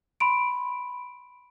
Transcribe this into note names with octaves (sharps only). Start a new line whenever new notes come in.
B5 C6 D7